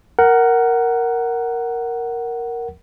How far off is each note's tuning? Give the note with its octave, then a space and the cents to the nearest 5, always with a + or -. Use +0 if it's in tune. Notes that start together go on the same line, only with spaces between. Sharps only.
A#4 +0 F#5 +15